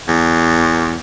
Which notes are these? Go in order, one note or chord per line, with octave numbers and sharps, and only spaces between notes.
E2